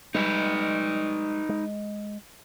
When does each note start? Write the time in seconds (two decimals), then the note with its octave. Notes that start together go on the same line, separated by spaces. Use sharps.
0.15 G3 G#3 D#4 B4
1.49 G#3